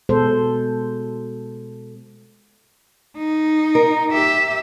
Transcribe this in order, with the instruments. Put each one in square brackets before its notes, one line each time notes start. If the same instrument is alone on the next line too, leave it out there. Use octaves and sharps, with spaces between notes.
[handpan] B2 G#3 A4 C5
[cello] D#4
[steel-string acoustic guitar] A#4
[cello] G4 E5